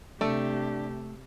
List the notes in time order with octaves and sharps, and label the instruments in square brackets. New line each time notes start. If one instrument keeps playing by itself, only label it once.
[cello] C3 G4 [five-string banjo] A3 [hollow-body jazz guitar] D4